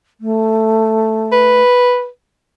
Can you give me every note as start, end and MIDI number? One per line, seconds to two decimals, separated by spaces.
0.21 1.61 57
1.32 2.07 71